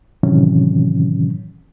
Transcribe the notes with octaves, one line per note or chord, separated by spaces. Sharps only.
A2 C3 D#3 E3 F#3 C#4